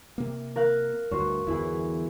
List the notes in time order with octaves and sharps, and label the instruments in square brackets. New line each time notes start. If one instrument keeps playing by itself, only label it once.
[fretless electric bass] C3 A#3
[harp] A#4 F5 F#6
[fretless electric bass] D2 G2 [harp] F#4 C5 C#5
[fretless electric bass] G1 E2 E3 [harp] E4 G#4